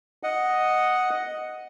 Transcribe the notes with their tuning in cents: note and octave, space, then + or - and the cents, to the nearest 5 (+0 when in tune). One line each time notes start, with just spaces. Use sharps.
D#5 +0 F#5 +0